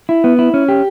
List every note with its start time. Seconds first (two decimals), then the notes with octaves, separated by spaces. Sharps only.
0.09 E4
0.24 B3
0.39 E4
0.54 C#4
0.69 G4